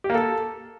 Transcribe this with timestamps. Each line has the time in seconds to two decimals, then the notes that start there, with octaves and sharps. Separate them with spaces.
0.04 G4
0.10 A#3
0.15 A4